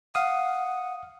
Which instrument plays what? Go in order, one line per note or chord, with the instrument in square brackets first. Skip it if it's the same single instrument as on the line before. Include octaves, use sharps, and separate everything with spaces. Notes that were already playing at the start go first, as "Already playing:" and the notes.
[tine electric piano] F5 D#6 [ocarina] F#5